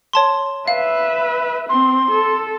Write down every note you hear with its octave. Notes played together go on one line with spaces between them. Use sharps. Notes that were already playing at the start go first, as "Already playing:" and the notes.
C#5 A5 C6
B4 E5 F5
C4 C6
A4